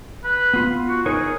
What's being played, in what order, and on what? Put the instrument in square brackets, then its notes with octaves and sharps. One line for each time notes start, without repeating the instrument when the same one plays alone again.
[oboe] B4
[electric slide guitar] B3 F4
[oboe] F#4
[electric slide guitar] D#4 A#4 C#5 [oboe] G#4